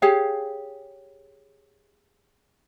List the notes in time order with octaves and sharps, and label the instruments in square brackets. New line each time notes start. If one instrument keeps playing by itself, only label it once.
[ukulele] G4 G#4 C#5 F5